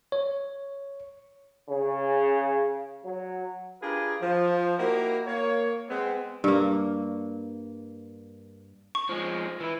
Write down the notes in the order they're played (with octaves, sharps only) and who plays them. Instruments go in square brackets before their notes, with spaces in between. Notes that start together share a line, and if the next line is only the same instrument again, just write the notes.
[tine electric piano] C#5
[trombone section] C#3
F#3
[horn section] D4 F4 G4 G#4 A#4 B4
F3
A#3 D#4 E4 F#4 G4 A#4
A#3 C#5
G#3 B3 C4
[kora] G2 A#3
[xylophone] C#6
[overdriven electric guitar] F3 G#3
E3 E4